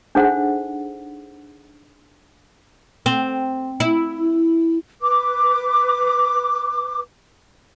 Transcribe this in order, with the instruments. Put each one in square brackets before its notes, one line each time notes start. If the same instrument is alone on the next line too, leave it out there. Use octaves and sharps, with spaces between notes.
[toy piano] D4 D#4 G#4 A4 C5 F#5
[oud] C4
E4
[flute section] B4 D6